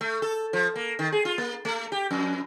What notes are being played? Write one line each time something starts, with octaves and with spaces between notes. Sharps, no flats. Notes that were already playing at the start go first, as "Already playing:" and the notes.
A3
A4
F3
A#3
D#3
G#4
F4
A#3
A3
G4
F2